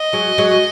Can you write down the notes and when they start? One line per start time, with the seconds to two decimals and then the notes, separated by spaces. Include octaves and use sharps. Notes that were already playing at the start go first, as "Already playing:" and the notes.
Already playing: D#5
0.13 F#3 G#3
0.38 F#3 G#3